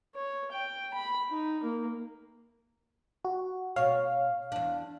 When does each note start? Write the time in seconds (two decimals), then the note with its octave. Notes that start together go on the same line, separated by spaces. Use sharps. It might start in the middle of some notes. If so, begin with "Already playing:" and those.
0.15 C#5
0.52 G5
0.94 B5
1.30 D#4
1.63 A#3
3.25 F#4
3.76 B2 C#5 F5
4.52 E2 D4